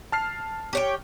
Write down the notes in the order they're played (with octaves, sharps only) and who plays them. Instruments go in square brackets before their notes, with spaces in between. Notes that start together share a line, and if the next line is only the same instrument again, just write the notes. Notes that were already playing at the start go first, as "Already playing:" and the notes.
[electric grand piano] A5 F6 C7
[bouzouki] G4 C#5 G5